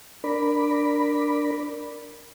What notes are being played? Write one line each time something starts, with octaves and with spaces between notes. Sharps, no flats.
D4 A#4 D5 B5